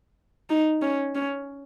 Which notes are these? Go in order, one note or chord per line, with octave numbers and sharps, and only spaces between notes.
D#4
C#4
C#4